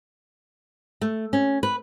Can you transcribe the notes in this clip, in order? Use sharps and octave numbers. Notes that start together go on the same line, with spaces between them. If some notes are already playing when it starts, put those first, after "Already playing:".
A3
C#4
B4